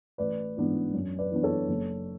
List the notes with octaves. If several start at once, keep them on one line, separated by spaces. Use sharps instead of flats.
A1 B4 D5
G#2 E3 B3 D4
F#2
B4 D5
E3 B3 D4
A4 C#5
F#1